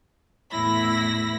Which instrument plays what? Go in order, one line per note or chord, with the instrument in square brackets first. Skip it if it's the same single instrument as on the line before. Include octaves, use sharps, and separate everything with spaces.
[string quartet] E2 A2 E4 B5 A#6